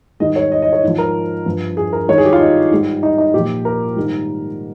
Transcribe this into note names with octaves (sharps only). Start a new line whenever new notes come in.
G#2 D#3 G3 D#5
C#5
D#5
D#5
C#5
G#2 F3
A#4
G2 F3
G#4
A#4
G#2 D#3 G3 C#5
G#4
G4
F4
D#4
G#2 G3
D#4
D#4
A#2 F3 G4
A#4
G#2 D#3 G3